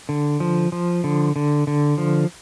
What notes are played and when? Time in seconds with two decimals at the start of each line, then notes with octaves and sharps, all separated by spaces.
0.09 D3
0.40 F3
0.72 F3
1.04 D3
1.36 D3
1.67 D3
1.98 F3